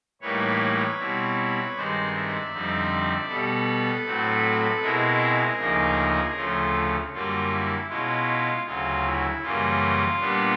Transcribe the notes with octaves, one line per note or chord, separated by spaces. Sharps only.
A2 E3 G3 A#3 D#4 B4 C#5
B2 G3 C4 E4
G2 D#3 G#3 C4 D#4 C5 D5
D5 E5
F2 D3 G3 C4 D#4
B2 G3 B3 A4 B4
A2 F#3 A3 C4
B2 G#3 C4 E4 G#4 A#4
D2 C#3 F3 A#3 D#4
D2 C#3 F3 A3 C#4 F4
F#2 D3 G3 A#3 F4
E4
B2 G#3 C#4 E4 F4
D2 C#3 F#3 F4
E4
F#2 C#3 E3 G3 A#3 F4
A#2 G3 B3 D4